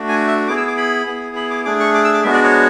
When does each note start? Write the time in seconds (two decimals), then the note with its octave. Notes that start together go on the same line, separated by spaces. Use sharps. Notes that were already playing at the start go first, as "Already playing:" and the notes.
Already playing: A3 D4 F#4
0.09 G#5
0.28 E5
0.48 B3 E4 G#4 D6
0.57 E6
0.67 D6
0.77 B5
1.06 B3 E4 G#4
1.36 B5
1.50 D6
1.65 A3 D4 G#4 D6
1.80 C#6
1.94 D6
2.05 E6
2.14 D6
2.24 G#3 B3 D4 F#4 E5
2.33 D5
2.44 C#5